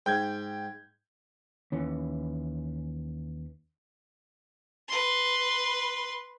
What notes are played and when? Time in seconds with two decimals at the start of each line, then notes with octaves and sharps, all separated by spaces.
0.06 G#2 G5 G6 G#6
1.72 D#2 E3 C#4
4.88 B4 C6